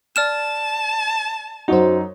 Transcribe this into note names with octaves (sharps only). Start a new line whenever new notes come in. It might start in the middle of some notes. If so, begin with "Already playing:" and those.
D5 A5 F6 E7
F#2 D#4 F#4 C5